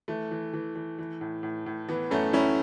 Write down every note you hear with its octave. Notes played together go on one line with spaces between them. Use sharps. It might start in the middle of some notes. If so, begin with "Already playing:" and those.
E3 A3
E3
E3
E3
E3
A2
A2
A2
E3 B3
F#2 A3 C#4
F#2 C#4 E4